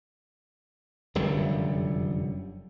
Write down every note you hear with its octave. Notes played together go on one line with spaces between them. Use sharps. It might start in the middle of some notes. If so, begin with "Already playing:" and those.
F1 F#2 D3 G3